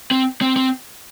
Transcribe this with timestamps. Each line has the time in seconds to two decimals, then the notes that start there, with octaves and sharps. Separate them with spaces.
0.11 C4
0.41 C4
0.57 C4